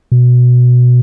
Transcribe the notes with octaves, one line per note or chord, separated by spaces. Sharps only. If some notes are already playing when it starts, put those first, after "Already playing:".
B2